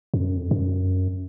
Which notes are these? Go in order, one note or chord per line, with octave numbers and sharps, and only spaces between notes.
F2
F#2
F2
F#2